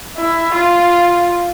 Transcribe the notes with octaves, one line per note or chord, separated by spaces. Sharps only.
E4
F4